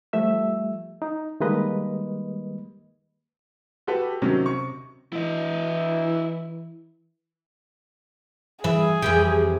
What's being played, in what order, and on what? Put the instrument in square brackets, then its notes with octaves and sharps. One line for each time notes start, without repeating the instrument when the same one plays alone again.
[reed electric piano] F3 G3 A3 E5 E6
D#4
D#3 G3 G#3 A#3 B4 D#5
[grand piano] F#4 G4 A4 B4
C3 D#3 F#3 C#4
C3 C#6
[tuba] E3 [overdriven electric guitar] E4 D#5
[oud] E3 E5 [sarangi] G#4
[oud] F2 E3 G4